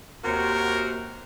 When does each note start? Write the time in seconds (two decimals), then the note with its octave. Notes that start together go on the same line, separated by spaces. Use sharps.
0.25 D#2 C3 F#4 A#4